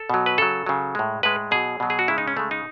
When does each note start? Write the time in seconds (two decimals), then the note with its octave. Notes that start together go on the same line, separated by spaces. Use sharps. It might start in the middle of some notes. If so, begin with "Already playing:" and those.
Already playing: A4
0.10 B2 F#3
0.26 B4
0.38 C#3 F#3 A4
0.66 C#3 F#3
0.95 A2 G#3
1.23 A2 G#3 B4
1.51 B2 F#3 G#4
1.80 B2 F#3
1.90 G#4
1.99 F#4
2.08 C#3 G#3 E4
2.18 D#4
2.28 C#4
2.37 C#3 G#3 A3
2.51 D#4